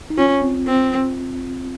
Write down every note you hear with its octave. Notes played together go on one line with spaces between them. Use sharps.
D#4
C#4 F4
C4
C4